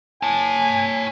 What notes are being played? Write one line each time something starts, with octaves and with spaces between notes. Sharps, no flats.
C#5 G#5 A5